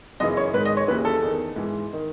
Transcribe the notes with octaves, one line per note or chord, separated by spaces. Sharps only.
F#2 C#3 E3 D#5
C#5
G#2 D#3 B4
D#5
C#5
D#2 C#3 E3 B4
A4
E2 D#3
G#2 E3
D#3